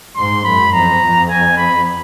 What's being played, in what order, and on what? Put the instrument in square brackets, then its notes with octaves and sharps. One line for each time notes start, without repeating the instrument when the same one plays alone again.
[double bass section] G#2 [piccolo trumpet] C6
[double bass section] F#2 [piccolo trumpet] B5
[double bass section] F2 [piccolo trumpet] A#5
[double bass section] F2
[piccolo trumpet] G#5
B5